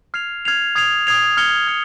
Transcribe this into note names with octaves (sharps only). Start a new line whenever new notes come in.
F6 G#6 C7 F7
F6 G#6 C7 F7
D#6 G#6 C7 F7
D#6 G#6 C7 F7
F6 G#6 C#7 G7
F6 G#6 C#7